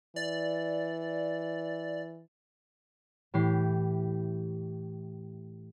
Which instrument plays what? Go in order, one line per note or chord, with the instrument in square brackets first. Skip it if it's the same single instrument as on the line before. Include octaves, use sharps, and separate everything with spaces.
[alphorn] E3 [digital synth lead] D5
[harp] A2 E3 G4 C7